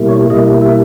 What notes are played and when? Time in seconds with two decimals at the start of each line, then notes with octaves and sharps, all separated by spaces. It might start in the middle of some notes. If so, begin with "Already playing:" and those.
Already playing: B2 G3 A#3 E4
0.09 C#5
0.30 B2 G3 A#3 E4 D#5
0.62 E5